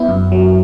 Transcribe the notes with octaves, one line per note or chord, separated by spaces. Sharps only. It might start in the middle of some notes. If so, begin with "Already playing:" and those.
Already playing: B3 E4
F#2
F#3